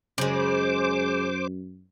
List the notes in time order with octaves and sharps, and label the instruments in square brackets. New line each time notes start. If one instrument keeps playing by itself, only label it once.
[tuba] F#2 [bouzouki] C#3 G#3 [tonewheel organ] C5 D6